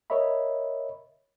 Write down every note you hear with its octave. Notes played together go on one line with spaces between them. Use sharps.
A#4 C#5 D#5 E5 B5